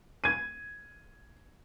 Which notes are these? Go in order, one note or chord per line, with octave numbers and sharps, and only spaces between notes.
G#6 D#7